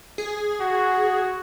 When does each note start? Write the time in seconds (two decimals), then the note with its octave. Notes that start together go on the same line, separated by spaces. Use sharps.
0.18 G#4
0.60 F#4